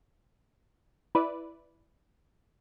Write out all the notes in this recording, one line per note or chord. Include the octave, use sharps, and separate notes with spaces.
E4 B4 D5